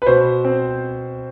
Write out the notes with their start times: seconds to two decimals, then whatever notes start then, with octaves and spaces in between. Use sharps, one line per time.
0.02 B4
0.07 B2 C5
0.45 C4